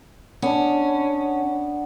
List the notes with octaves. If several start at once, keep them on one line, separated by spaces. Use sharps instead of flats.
B3 C#4 D4